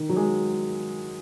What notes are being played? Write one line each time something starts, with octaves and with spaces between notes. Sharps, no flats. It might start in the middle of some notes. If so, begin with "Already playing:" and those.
Already playing: D#3
F#3
G#3